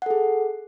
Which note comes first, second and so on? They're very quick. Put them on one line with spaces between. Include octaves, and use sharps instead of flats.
F#5 A4 G#4